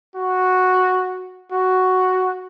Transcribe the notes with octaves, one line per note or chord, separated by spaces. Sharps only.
F#4
F#4